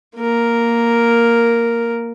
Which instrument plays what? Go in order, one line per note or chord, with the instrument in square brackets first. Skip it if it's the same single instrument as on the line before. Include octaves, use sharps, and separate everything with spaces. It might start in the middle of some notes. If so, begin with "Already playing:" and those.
[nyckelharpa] A#3 A#4